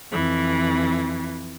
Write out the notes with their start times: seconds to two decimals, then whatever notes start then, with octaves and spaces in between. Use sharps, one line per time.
0.12 F2 E3